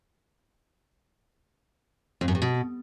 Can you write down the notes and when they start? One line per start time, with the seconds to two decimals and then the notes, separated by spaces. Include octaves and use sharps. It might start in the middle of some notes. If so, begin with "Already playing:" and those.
2.21 F2
2.28 F#2
2.35 G2
2.42 B2